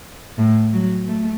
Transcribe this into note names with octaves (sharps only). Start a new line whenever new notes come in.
A2
F#3
A3